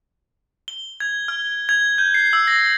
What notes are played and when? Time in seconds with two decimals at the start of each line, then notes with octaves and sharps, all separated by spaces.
0.68 G7
1.00 G#6
1.28 F6
1.69 G#6
1.98 G6
2.14 C7
2.33 E6
2.48 A#6